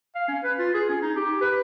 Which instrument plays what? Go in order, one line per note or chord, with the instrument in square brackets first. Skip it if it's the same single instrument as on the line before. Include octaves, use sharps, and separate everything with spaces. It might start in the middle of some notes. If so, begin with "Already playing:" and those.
[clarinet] F5
C#4
B4
F4
G#4
C#4
D#4
G4
B4